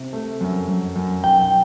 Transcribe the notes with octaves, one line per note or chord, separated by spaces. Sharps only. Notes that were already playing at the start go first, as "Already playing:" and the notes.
Already playing: C3
A3
F#2
F#2
F#2
B1 G5